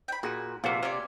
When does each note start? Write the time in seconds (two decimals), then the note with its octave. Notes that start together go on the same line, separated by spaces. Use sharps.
0.08 G5 B5
0.23 A#2 F#4 G#4 G#5
0.64 A#1 C3 A3 A#3 F4 F#4 B4 F5
0.83 C3 C#4 C#5 D5